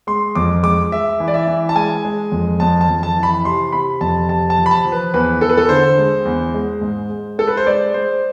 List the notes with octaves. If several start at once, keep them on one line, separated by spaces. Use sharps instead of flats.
G#3 C6
F2 D6
G#3 D6
G#3 E5
E3
D5
E5
E3
A5
G#3 G#5
G#3
F2
F2 A5
A5
F2
A5
E3
B5
C3 C6
C3 B5
F2 A5
C3 A5
A5
F3
B5
A5
F3
B4
E2 B4
E2 A4
B4
A4
D3 C5
G#3
E2
G#3
G#2
G#3
G#3 A4
B4
C5
G#3 D5
G#3 C5